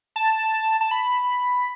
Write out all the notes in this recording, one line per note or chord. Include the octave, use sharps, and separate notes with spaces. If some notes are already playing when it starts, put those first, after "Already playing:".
A5
A5
B5